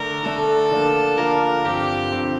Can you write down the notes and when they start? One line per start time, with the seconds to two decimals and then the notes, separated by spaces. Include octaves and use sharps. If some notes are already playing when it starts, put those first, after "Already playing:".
Already playing: D3 A3 D4 A#4
0.23 D3 A3 D4 A4
0.71 D3 F3 A#3 D4 F4
1.17 D3 F3 A#3 D4 F4 A#4
1.64 G2 D3 F3 C4 G4
2.12 G2 D3 F3 C4